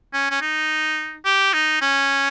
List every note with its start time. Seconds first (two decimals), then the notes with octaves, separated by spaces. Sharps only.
0.13 C#4
0.30 C#4
0.41 D#4
1.25 G4
1.53 D#4
1.81 C#4